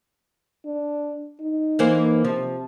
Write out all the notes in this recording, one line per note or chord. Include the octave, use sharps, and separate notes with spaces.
D4
D#4
E3 A#3 C5
C3 F3